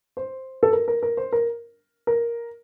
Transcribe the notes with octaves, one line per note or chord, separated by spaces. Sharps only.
C5
A4
A#4
A#4
A#4
C5
A#4
A#4